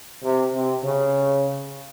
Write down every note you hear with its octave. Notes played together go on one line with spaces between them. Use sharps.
C3
C3
C#3